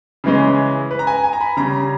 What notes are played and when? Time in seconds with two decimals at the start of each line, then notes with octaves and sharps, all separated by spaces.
0.24 C#3 E3 G#3 C#4
0.91 B4
0.99 A#5
1.07 G#5
1.24 G#5
1.33 A#5
1.41 B5
1.57 C#3 G3 C#4 A#5